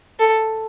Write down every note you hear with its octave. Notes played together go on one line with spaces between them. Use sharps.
A4